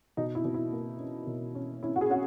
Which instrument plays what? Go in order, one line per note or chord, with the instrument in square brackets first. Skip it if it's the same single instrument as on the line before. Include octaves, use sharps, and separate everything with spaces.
[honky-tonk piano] B2 D#4
E4
B2
E4
A#3
C#4
B2
C#4
C#4 E4
F#4
G#4
C#4 F#4